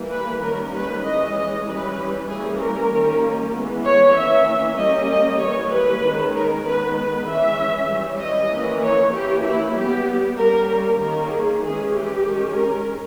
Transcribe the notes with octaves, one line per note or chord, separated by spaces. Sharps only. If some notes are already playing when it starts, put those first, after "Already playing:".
Already playing: E3 G3 A#3
B4
D#3 G3 A#3 C#4 A#4
B4
E3 G#3 C#4 D#5
D#5
E3 G3 C#4 B4
E3 G3 A#3 C#4 G#4
A#4
D#3 G3 A#3 C#4
E3 G#3 B3
C#5
E3 A#3 C#4 E5
G3 A#3 C#4 D#5
D#5
E3 G3 A#3 C#5
B4
D#3 G#3 C#4
A#4
D#3 G#3 B3 B4
B4
E3 G#3 C#4 E5
E3 G3 C#4
D#5
E3 A#3 C#4
C#5
E3 A#3 C#4 G4
E4
G3 B3 G4
G3 A#3 C#4 A#4
D#3 A#3 C#4 A#4
G#4
E3 G#3 C#4 G#4
G4
D#3 G#3 C#4
A#4